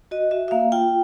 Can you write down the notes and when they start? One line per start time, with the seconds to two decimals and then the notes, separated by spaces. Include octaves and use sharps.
0.11 F#4 D#5
0.31 F#4 E5
0.48 E5
0.51 A#3 F5
0.72 F4 G5